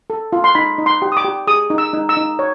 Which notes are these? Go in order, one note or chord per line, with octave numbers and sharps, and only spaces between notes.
A4
F4
C6
D#4 B5
D#4
C6
G4
D#6
D6
G4
G#4 D#6
D#4
E6
D#4
E6
D#4
C#5